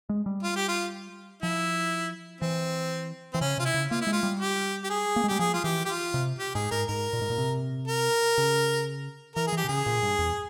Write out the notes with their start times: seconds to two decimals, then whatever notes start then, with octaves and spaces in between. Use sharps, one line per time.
0.09 G#3
0.26 G3
0.43 F4
0.56 G4
0.69 F4
1.43 F3 E4
2.41 E3 C4
3.34 E3 C4
3.41 C#3 C#4
3.58 C3 F4
3.66 E4
3.74 C#3
3.91 A#3 F4
4.02 E4
4.07 G#3
4.13 F4
4.23 G3
4.40 G4
4.84 G4
4.90 G#4
5.16 A#3
5.24 G#3
5.29 G3 G4
5.39 F3 G#4
5.54 F4
5.64 E3 G4
5.85 G4
5.89 F4
6.14 C3
6.39 G4
6.55 G#2 G#4
6.71 G#2 A#4
6.88 G#2 A#4
7.13 A#2
7.21 G#2
7.30 A#2
7.38 C3
7.88 A#4
8.38 C#3
9.36 E3 A#4
9.47 G#4
9.52 E3
9.57 G4
9.65 C3
9.68 C#3 G#4
9.86 A#2
10.02 G2
10.19 E2